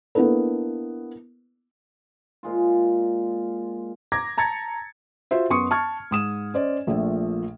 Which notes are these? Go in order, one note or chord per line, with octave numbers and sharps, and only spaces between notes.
A#3 B3 D4 E4 A4 B4
A#2 G#3 F4
A#5 D6 G#6 A#6
A5 A#5 G#6 A6 C#7
F4 F#4 C5 E5
F#2 B3 C6 C#6 D#6 C#7
A5 C#6 F6 G#6
G#2 D#6 E7
C#4 C5 D5 D#5
A#1 A#2 F3 A3